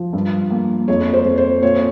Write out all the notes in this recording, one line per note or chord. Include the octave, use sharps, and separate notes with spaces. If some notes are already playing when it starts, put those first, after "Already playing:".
Already playing: F3
G2
A#3
F2 C#5
C5
F2
C5
A#2 C#5